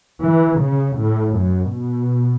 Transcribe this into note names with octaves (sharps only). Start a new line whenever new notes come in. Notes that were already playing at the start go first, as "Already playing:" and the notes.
E3
C#3
A2
F#2
B2